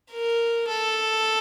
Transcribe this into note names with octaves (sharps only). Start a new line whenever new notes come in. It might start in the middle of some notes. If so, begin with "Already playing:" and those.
A#4
A4